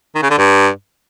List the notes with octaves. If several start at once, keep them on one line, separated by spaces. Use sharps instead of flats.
D#3
C#3
D3
G2